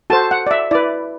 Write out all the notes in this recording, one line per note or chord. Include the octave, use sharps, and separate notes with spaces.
F#4 A4 C5 A5
F#5
D5
E5
E4 B4 D5